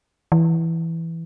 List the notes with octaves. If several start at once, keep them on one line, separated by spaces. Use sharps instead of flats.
E3